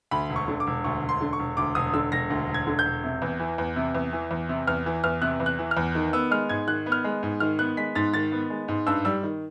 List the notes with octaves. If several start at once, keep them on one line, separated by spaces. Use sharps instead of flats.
D2 B5
E1
C#6
D3
D6
E1
D2 C#6
E1
C6
D3
C#6
E1
D2 D6
E1 D#6
D3 E6
E1 A#6
D2
E1
G#6
D3
G6
E1
C3
E2
E3
E2
C3
E2
E3
E2
C3
E2 F6
E3
E2 F6
C3 F#6
E2
F#6
E3
F6
E2
D#3
B3 E6
G#3 F6
G#2 G#6
D#3 F#6
B3
F6
G#3
G#2
D#3 F6
B3 F#6
G#3 B6
G#2 A6
D#3 A6
B3
G#3
G#2
G2 E6
G3 E6
D#3